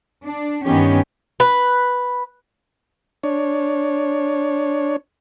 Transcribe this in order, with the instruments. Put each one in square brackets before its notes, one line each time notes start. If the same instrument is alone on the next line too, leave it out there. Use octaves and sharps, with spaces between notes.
[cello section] D4
G2 D#3 B3 C#4 G4
[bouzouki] B4
[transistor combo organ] D4 C#5